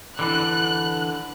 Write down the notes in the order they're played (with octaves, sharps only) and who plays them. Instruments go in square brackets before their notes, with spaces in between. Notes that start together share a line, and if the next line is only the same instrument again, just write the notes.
[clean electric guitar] D3 E3 D4 [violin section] F#6